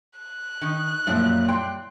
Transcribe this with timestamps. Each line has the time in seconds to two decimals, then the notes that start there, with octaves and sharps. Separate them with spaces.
0.19 F#6
0.61 D#3 D#4
1.07 F#2 A#2 F3 G3 E4
1.48 G3 G5 C6